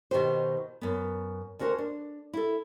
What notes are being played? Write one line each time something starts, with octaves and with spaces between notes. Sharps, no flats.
B2 D#3 D#4 F#4 G4 C5
F#2 B3
D2 C#4 F#4 A#4 C5
D4
E4 A4